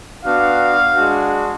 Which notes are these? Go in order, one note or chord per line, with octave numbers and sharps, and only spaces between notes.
B3 D4 F#4 F5
G#3 D4 F#4